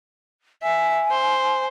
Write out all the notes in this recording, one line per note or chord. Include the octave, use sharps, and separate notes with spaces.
E5 G#5
C5